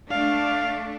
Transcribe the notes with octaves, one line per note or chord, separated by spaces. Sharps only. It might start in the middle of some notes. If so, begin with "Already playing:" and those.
A3 D4 F5